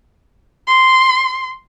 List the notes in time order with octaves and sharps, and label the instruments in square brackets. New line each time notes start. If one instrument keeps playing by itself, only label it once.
[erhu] C6